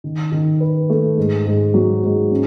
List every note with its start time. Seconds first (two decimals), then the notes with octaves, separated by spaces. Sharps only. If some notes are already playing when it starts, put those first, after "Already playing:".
0.04 D#3
0.32 D#3
0.61 B4
0.90 A3
1.17 G#2
1.46 G#2
1.74 F#3
2.03 G#2
2.31 C#4